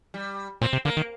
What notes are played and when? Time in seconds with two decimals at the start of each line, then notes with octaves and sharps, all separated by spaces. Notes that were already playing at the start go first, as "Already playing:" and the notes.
0.14 G3
0.61 A#2 C4
0.73 C3
0.85 D3 A#3
0.97 D#3